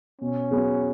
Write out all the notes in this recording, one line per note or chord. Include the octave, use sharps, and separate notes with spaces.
B2 C#4
F#3 B3 G#4